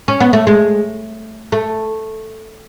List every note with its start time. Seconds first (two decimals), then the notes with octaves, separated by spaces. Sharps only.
0.08 C#4
0.20 B3
0.33 A3
0.47 G#3
1.52 A3